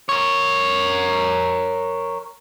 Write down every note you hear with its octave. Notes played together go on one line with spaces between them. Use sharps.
A#4 C#5